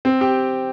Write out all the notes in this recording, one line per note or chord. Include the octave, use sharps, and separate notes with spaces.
C4
G4